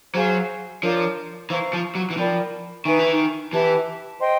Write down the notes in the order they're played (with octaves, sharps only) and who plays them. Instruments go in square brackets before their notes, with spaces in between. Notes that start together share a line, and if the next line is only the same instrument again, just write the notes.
[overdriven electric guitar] F#3 [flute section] G#4 C5 F5 G#5
[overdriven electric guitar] F3 [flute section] D4 F4 A#4 C#5
[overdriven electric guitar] E3 [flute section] C5 F5 A#5 C#6
[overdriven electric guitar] F3
F#3
E3
[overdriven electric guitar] F3 [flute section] A#4 D5 G5 B5
[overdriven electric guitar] D#3 [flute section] B4 E5 G#5 C#6
[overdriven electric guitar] E3
D#3
[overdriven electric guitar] E3 [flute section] G4 B4 E5 A5
[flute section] C5 D#5 G5 C6